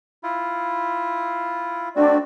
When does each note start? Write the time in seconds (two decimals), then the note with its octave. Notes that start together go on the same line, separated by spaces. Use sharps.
0.23 E4 F4
1.96 A3 C4 D4 F#4 D5